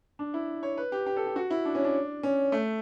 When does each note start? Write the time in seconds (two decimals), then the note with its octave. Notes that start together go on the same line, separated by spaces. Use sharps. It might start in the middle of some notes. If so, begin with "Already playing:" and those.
0.19 D4
0.34 E4
0.63 C#5
0.77 B4
0.92 G4
1.06 G4
1.16 A4
1.26 G4
1.36 F#4
1.50 E4
1.65 D4
1.75 C#4
1.84 D4
2.23 C#4
2.52 A3